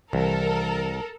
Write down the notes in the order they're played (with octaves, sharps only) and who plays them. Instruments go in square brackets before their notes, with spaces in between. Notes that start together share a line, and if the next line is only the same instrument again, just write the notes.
[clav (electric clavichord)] C2 [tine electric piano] E3 [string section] A4 A#4